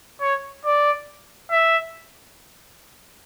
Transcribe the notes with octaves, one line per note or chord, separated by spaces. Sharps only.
C#5
D5
E5